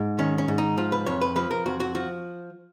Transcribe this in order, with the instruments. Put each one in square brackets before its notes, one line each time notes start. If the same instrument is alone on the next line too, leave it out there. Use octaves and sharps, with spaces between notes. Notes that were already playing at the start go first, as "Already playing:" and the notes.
Already playing: [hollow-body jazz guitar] G#2
D#3 C#4
C#4
G#2
D#4
F3 F4
B4
F2 C#5
B4
F3 B4
A#4
F2 F#4
F#4
F3 F#4